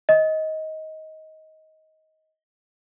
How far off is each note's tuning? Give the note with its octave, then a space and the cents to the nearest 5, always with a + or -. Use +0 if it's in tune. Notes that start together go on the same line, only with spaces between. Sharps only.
D#5 +20